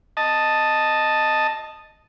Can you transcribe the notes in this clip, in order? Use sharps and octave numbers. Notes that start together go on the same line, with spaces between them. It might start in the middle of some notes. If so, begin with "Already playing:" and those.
D#5 A5